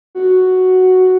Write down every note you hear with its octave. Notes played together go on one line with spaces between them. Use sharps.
F#4